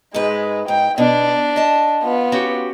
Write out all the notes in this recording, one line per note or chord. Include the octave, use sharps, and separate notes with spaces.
G#2 G#3 B4
G#2 G5
B2 D4
D#5 A5
B3 F4
C#4 F#4 G4